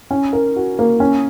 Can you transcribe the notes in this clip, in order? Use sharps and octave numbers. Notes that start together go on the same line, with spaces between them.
C#4
A#4
F#4
A#3
C#4